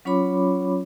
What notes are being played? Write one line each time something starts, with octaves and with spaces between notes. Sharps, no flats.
F#3 C#4 F4 C#5 B5 D6